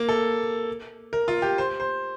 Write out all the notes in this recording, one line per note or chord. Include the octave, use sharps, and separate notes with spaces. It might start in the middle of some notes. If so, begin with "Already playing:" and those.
Already playing: A#3
A4
A#4
F4
G4
C5
C5